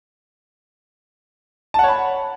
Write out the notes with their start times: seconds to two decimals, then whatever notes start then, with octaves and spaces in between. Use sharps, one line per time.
1.74 A5
1.79 F#5
1.84 C#5
1.88 B5